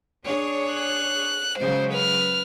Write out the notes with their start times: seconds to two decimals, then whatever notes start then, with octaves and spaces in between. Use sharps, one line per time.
0.26 D4 G#4 C#5
0.74 F#6
1.58 C#3 F#3 G#3 C5
1.93 B4 F6